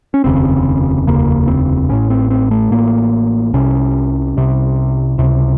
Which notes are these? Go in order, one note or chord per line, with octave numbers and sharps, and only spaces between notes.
C#4
F1 D#2 C#3 C4
F1 D#2 C#3 A#3
C4
A1 A2 C#4
C4
C4
A3
A1 A2 A#3
C2 C3 C#4
C2 C3
C#2 C3